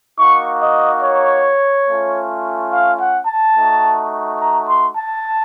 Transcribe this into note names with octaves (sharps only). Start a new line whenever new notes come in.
A#3 D#4 F#4 C#6
D#5
C#5
A3 C#4 F4
F5
F#5
A5
A3 D#4 F#4
A#5
C6
A5